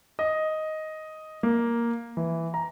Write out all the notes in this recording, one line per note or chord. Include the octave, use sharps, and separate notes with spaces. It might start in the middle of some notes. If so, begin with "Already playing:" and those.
D#5
A#3
E3
A#5